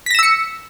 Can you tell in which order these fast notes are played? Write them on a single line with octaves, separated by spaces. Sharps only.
B6 A#6 E7 E6 C#7